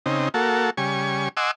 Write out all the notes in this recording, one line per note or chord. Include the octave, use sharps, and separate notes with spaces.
C#3 C4 D#4
A#3 F#4 A4
C#3 G3 G#5 C#6
D#5 F#5 G#5 C6 D6 E6